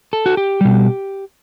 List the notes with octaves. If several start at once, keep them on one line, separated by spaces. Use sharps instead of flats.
A4
F#4
G4
B2 G3